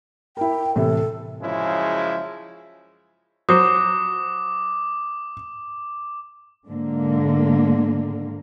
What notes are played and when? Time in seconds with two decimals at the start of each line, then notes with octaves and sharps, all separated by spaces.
0.37 E4 A#4 G5
0.76 A2 C3 E3 A4
1.40 F#2 C#3 F3 G#3 C#4 E4
3.49 F#3 C5 D6 D#6
6.68 G#2 D3 A#3